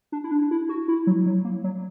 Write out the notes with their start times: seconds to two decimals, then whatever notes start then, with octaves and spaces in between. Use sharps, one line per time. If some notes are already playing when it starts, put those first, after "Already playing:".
0.12 D4
0.24 E4
0.31 D4
0.51 E4
0.69 F#4
0.88 E4
1.07 F#3
1.26 F#3
1.44 A#3
1.64 F#3